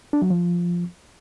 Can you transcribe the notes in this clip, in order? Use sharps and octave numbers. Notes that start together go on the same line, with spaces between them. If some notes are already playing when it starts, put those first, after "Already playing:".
D4
F#3
F3